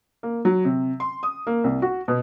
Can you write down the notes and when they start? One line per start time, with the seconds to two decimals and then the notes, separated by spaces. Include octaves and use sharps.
0.23 A#3
0.45 F#3
0.65 C3
1.00 C6
1.23 D#6
1.47 A#3
1.64 C2
1.82 F#4
2.08 B2